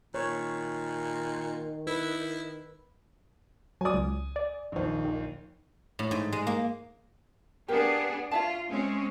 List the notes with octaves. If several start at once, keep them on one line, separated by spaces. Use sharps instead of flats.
A#2 D#3 C#5
E4 B4
F#3 D5 G#5 D#6
C#2
D5
A#1 D#2
D#3
A2
G#2
G#3
A#3
B3 D4 G4 G#4 A#4
F4 C#5 E5 A5
G#3 C4 C#4